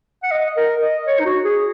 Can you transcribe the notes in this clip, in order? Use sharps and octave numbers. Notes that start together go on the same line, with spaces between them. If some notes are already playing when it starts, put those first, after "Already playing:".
F#5
D#5
A#4
D#5
C#5
D#4
F#4
G#4